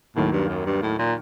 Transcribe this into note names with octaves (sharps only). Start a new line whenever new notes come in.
D#2 A2 D#3 F#3 A#3
G2
F#2
G2
A2
A#2